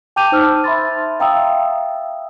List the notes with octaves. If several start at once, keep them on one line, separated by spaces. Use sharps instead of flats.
G5 A5 D6 G6 D#7 F7
D#4 C5 A5 E6 F6
E5 B5 C6 A6
E5 F5 G5 A#5 D#6 E6